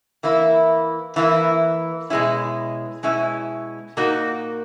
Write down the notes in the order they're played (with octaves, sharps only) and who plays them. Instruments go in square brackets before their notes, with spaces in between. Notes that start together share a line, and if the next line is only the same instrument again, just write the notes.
[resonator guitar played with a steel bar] E3 A#3 E4
E3 A#3 E4
B2 G#3 C#4 E4
B2 G#3 C#4 E4
A#2 A#3 D#4 F#4